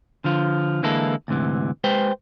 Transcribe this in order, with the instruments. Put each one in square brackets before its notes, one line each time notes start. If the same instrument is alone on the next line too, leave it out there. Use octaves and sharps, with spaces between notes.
[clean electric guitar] D3 F3 F4
D3 E3 G#3 A#3 E4 A4
D2 G#2 C3 E3
G#3 G4 B4 C5 G5